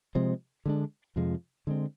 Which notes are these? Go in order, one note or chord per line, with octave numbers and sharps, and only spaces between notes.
C3 F3 G#3 C4
D3 G#3 D4
F2 C3 F3 G#3
D3 G#3 C4